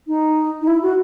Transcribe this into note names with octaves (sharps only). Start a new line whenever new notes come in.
D#4
D#4
E4
F#4